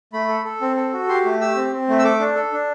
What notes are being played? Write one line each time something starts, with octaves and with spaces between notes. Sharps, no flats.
A3 B5
A4
A4
C4
A4
F#4
G4 C6
A3
G4 E6
C4
C4
A3
E6
A4 D6
D4
A4
D4